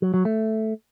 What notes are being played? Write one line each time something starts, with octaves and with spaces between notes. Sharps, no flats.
F#3
F#3
A3